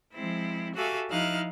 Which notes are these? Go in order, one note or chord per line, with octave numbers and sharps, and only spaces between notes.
F3 G#3 C4 E4
F#4 G4 A4 E5 F5 G#5
F3 D#4 E4 F5 F6 F#6